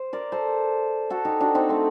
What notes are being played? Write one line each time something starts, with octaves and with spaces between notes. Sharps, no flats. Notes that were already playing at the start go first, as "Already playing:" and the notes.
Already playing: C5
A#4 D5
A4 C5
F#4 A4
D#4 G4
D4 F#4
C4 D#4
A3 C4